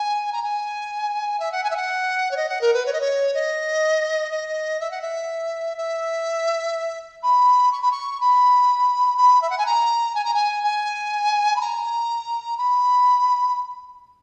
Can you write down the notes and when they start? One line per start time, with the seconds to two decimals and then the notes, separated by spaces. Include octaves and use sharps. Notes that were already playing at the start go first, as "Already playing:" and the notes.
Already playing: G#5
0.32 A#5
0.42 G#5
1.39 E5
1.52 F#5
1.63 G#5
1.70 E5
1.76 F#5
2.31 C#5
2.36 D#5
2.49 F#5
2.61 A#4
2.73 B4
2.85 C#5
2.93 D#5
3.00 C#5
3.34 D#5
4.31 D#5
4.80 E5
4.90 F#5
5.01 E5
5.77 E5
7.23 B5
7.72 C#6
7.81 B5
7.91 C#6
8.20 B5
9.17 B5
9.41 E5
9.50 F#5
9.58 G#5
9.66 A#5
10.14 G#5
10.24 A#5
10.34 G#5
10.63 G#5
11.56 B5
11.60 A#5
12.57 B5